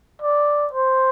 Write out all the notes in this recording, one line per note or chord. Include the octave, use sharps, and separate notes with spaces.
D5
C5